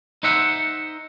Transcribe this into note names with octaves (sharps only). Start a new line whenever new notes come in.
D#4 C5 E5 F#5